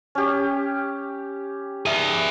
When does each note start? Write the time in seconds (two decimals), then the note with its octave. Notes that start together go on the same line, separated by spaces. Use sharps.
0.15 C#4 G4
1.86 G#4 E5